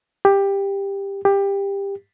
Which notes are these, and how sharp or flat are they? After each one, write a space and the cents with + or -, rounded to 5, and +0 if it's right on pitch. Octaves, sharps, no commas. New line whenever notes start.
G4 +15
G4 +20